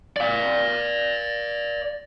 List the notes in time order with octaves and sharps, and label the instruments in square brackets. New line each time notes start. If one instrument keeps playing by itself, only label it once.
[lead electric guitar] D5 F5